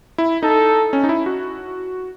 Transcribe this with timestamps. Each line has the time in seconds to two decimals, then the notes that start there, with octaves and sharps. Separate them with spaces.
0.18 E4
0.43 D#4 A4
0.93 C#4
1.04 D#4
1.09 E4
1.26 F#4